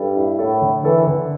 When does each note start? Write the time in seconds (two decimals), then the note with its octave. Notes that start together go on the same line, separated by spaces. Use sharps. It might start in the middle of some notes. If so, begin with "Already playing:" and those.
Already playing: G2 A4
0.16 E4
0.39 A2 A4
0.62 D3
0.84 E3 A4
1.07 D3